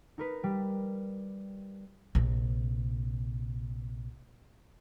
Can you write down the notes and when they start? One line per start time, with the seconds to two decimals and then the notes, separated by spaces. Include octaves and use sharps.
0.18 D#4 A#4 B4
0.44 G3
2.15 A#1 C3